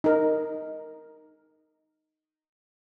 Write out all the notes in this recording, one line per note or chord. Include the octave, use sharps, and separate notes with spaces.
D#4 A#4